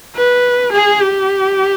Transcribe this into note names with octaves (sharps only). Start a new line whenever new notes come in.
B4
G#4
G4